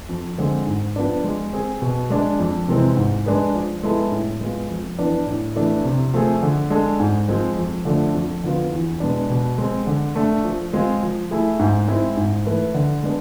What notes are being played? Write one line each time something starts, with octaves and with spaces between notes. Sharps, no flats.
F2
D3 G#3 C4 G#4
G#2
F3 B3 D4
G#3
C4 G#4
B2
G#3 D4
F2
C3 E3 G#3 C4
G#2
G#3 D4 G#4 B4
F3
G#3 B3 E4 A4
A2
G#3 B3 F4
F2
E3 B3 D4
A2
E3 A3 D4
C3
F3 A3 C4 G#4
D3
G#3 D4 A4
G#2
F3 G#3 C4
F2
D3 F3 A3 D4
F2
D3 F3 B3 F4
E2
B2 G#3 B3 D4
B2
G#3 C4
D3
A3 D4
F3
G#3 C4 F4 G#4
F3
A3 E4 G#4
G#2
G#3 C4 E4
G#2
E3 A3 E4 B4
D3
G#3 B3 D4